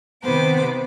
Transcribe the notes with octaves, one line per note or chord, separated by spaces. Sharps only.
C3 D#3 B3 B4 C5 D6